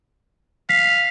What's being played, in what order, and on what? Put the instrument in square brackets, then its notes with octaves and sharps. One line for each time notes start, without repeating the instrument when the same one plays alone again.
[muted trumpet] F5 [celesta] B6